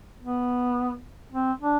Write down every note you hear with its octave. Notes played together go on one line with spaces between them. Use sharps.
B3
C4
D4